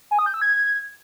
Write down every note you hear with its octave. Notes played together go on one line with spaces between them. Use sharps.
G#5
D#6
G6
E6
G#6